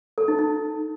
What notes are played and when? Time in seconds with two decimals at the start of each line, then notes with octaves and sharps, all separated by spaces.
0.18 A4
0.28 D#4
0.39 D#4